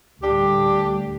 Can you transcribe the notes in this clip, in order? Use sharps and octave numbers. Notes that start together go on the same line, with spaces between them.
D2 A2 G3 D4 G4